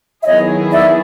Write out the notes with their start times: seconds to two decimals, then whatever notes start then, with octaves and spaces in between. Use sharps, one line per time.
0.21 E5
0.25 D#3 F#3 B3 E4 G#4 C#5 D#5
0.71 D5 E5